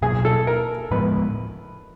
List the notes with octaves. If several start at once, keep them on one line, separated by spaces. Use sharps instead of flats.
B2 F#3 A#3 G#4
A4
A#4
A2 F3 G#3 B3 B4